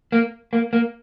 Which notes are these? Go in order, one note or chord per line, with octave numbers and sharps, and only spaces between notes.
A#3
A#3
A#3